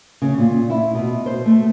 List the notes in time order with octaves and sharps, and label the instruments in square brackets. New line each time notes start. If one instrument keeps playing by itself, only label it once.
[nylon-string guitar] C#3
A#2
E4
B2
C5
A3